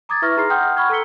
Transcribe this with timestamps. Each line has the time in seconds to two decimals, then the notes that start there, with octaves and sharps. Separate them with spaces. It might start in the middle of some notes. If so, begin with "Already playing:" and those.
0.09 A#5 D6 D#6 G#6 A6
0.22 E4 B4 E5 C#6 F6 A#6
0.37 D#4 G#4 A#5 C6 F6 C7
0.50 F#5 G5 C6 D#6 F6 G6
0.77 F#5 B5 C#6 F6 G#6
0.90 A4 A#5 E6 B6 C#7 G7